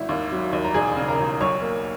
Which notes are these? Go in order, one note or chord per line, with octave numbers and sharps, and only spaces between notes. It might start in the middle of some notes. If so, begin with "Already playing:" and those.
Already playing: G#1 E4 E5
D#2
F#3
D#2
A#5
E1 G#4 G#5
C#3
A#4 A#5
E1
B1 C#5 C#6
A#3